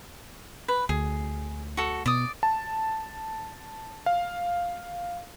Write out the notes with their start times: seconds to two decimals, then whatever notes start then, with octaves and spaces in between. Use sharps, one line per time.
0.68 B4
0.89 D2 G#4
1.77 F#4 A4
2.06 B2 D5 D#6
2.43 A5
4.06 F5